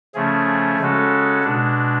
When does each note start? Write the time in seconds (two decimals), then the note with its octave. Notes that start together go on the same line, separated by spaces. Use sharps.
0.14 C#3 F3 A3 C#4 G#4
0.80 C#3 G#3 C#4 F#4 A4
1.44 B2 G#3 D4